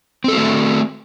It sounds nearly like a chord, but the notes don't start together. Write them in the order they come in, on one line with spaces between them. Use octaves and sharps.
C4 A4 F#4 A3